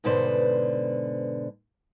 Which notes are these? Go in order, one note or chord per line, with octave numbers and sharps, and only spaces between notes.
G#2 B2 D3 B4 C5 D5